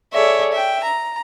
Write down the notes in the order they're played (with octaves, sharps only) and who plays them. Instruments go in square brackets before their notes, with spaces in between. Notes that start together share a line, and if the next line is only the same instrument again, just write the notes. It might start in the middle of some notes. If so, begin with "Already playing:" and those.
[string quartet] G#4 A4 C#5 D5 E5
E5 G5
A#5